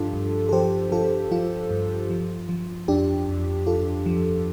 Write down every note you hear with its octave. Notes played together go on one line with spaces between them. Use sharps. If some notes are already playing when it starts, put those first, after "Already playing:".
Already playing: G2 F3 D4 F4 G4 A4
G2
A4
F3 G4 C5
F3 F4 A4
F3 F4
G2
F3
F3
F2 D4 G4
F2
F2 F4 A4
F3